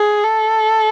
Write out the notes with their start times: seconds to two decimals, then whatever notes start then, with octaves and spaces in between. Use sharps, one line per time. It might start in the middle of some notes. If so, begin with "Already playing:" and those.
Already playing: G#4
0.24 A4